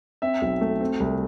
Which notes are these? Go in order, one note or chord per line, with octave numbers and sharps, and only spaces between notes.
C4 E5
B1
A3
C4
C2